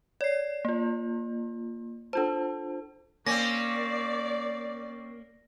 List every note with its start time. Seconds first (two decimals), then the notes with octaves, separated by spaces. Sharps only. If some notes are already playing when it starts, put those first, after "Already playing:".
0.21 C#5 D5 C7
0.65 A#3 F4
2.13 D4 F4 A4 C5 A5
3.27 A#3 C4 C#4 D5 A#6